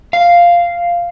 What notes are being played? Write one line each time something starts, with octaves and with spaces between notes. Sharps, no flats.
F5